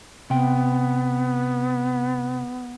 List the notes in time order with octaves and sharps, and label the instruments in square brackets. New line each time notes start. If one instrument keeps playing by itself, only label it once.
[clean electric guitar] C3 G5 [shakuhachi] B3